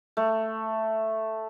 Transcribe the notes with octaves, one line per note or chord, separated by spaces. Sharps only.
A3